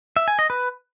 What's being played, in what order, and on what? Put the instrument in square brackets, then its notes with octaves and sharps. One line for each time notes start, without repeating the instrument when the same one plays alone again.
[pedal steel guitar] E5
G#5
D#5
B4